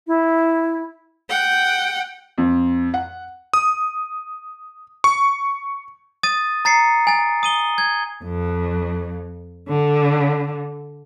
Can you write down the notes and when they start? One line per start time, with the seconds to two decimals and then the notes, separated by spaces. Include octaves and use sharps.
0.07 E4
1.29 F#5 G5
2.38 F2
2.94 F#5
3.53 D#6
5.04 C#6
6.23 D#6 A6 D#7
6.65 A#5 A6 C7 C#7
7.07 G#5 A6
7.43 D#6 D#7 G7
7.78 G#6
8.24 F2
9.69 D3